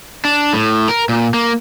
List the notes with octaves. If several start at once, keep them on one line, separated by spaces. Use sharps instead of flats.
D4
A2
A#4
A#2
A#3